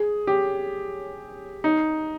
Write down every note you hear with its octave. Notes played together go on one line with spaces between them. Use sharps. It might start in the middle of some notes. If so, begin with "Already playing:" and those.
Already playing: G#4
G4
D#4